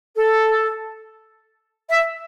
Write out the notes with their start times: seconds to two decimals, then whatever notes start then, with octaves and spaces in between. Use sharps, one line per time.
0.16 A4
1.89 E5